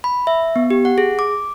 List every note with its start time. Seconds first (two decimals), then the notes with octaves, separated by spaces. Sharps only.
0.04 B5
0.27 E5
0.56 B3
0.70 G4
0.85 F#5
0.98 G#4
1.19 D6